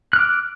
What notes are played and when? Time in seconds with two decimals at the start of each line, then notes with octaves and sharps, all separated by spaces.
0.13 F#6
0.16 F6
0.19 D6